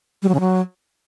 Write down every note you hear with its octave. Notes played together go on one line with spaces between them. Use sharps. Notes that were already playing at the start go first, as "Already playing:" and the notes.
G3
F#3
C#3
F#3